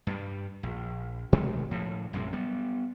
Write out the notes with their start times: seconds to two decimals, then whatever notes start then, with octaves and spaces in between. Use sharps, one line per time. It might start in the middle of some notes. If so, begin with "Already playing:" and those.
0.07 G2 G3
0.63 A#1
1.32 B2 D#3 G#3 A3
1.71 A2 F3
2.13 A#1 F#2 C3 G#3
2.33 G3 B3